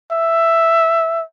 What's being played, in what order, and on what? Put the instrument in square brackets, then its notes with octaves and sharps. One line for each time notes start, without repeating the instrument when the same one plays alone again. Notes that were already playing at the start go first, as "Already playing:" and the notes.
[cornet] E5